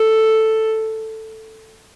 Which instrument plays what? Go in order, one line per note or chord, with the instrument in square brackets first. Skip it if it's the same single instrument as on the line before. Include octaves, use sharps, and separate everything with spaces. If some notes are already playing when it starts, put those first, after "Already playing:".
Already playing: [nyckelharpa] A4